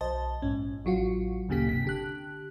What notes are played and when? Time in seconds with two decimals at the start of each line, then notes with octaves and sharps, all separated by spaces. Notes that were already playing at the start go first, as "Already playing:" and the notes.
0.01 B1 C5 D#5 A5
0.42 A#1 G#2 C#4
0.85 A1 F#3 F4 F#4
1.49 D2 A#2 C#3 A#3 G4 B6
1.66 G1 C3 B6
1.85 D3 G4 F#6